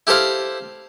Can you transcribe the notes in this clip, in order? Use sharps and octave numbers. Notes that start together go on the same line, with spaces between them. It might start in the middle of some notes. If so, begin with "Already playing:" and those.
E4 G4 A4 C5 F5